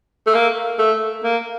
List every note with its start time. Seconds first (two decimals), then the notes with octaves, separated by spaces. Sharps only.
0.27 A3
0.34 A#3
0.79 A3
1.24 A#3